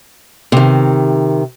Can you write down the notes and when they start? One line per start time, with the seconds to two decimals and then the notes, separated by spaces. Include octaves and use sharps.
0.52 C3 D#3